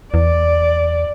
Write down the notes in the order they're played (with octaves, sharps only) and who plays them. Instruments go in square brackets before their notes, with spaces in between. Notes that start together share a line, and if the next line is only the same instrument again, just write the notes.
[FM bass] E2 [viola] D5